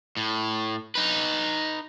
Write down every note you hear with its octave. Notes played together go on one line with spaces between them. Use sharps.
A2
D#4 B4